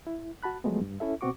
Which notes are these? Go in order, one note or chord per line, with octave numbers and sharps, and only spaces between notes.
E4
F#4 A5 B5 F#6
F3 F#3 G#3 A3 B3
G2
C#4 E4 A4 E5
B2 C4 F#4 C#6 D6